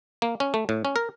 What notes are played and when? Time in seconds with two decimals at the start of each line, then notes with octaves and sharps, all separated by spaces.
0.22 A#3
0.40 C#4
0.54 A3
0.69 A2
0.85 C#4
0.96 A#4